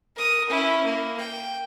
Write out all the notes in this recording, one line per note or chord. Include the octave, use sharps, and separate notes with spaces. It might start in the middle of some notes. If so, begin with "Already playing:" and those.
A#4 D#6
C#4 E4
A#3
G5